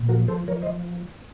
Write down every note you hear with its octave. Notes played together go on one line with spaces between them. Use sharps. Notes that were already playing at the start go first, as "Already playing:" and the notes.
Already playing: A#2
F3 F#4 A#4
F3 A4 C5
F3 A#4 C#5
C5 D#5
F3